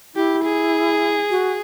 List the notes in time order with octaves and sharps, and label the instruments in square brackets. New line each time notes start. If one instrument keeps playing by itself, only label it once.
[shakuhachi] E4 [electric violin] G4
[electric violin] G#4
[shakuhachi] F#4